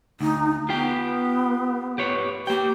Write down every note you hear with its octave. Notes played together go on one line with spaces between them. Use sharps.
D2 D#4
B3 F4 G4 G5
G4 B4 C#5
A#3 G4 G5